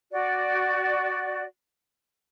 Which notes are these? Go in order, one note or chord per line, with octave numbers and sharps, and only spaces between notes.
F#4 D5